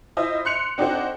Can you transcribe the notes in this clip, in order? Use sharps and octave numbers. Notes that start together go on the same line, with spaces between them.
E4 F4 C5 D#5 E5
C6 F#6 C#7 F7
C4 D4 D#4 F#4 A4 C5